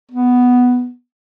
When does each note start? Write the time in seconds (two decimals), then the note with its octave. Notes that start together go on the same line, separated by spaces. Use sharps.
0.12 B3